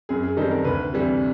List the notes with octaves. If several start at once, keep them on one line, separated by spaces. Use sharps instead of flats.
F#2 G#4
G#4
D#3 G3 C4 D#4 A4
A#4
D2 B4
C3 E3 G3